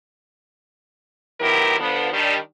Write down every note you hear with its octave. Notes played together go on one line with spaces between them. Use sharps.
D#3 F#3 B3 E4 G4 A#4
D3 F3 B3
D#3 G3 D4